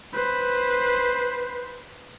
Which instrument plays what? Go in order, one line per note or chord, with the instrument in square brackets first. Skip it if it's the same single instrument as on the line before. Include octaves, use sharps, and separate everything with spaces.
[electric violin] B4 C5